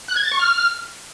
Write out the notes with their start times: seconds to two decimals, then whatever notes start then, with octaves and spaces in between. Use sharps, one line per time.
0.08 F#6
0.16 G#6
0.24 A6
0.31 C#6
0.39 F6